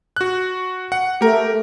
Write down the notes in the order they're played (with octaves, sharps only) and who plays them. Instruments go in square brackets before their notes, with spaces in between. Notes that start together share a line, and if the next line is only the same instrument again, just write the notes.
[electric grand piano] F#4 F#6
F#5
[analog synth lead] A3 [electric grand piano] G4 A#4